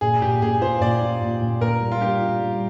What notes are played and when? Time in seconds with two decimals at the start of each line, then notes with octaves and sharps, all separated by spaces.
0.01 A#2 G#4
0.21 A#2 G4
0.42 A#2 G#4
0.61 F4 C5
0.81 A#2 D5
1.02 F4
1.22 A#2
1.41 A#2
1.61 A#2 A#4
1.81 G3
1.92 F4
2.00 D4 G4
2.21 F4
2.41 G3